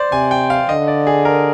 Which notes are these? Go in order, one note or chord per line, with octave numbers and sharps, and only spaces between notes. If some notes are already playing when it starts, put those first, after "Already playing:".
Already playing: C5 D5
C3 G#5
G5
F5
D3 D#5
D5
G#4
A#4